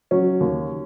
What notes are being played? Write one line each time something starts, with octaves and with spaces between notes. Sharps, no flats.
F#3 C#4
D#2